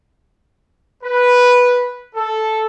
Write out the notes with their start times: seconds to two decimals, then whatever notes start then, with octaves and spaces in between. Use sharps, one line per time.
1.04 B4
2.15 A4